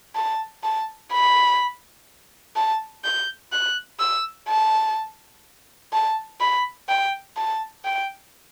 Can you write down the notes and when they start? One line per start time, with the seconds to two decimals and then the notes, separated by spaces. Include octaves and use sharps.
0.15 A5
0.64 A5
1.12 B5
2.56 A5
3.04 G6
3.52 F#6
4.00 E6
4.48 A5
5.93 A5
6.41 B5
6.89 G5
7.37 A5
7.85 G5